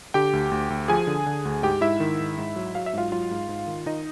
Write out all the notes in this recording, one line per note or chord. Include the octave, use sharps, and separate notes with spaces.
D3 G4 G5
D2
D2
D2
F3 G#4 G#5
D3
D3
D2
G#2 G4 G5
G#2 E4 E5
D#3
G#2
G#2
F#3
F#3 F5
E5
G#2 F4 F5
F#3 F4 F5
G#2
G#2
D#3
D#3 D#4 D#5